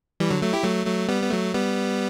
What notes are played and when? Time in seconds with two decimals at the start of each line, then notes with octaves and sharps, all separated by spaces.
0.20 E3 G3
0.30 D3 F#3
0.42 F#3 A3
0.53 E4 G4
0.64 F#3 A3
0.86 F#3 A3
1.09 G3 B3
1.23 B3
1.31 F#3 A3
1.54 G3 B3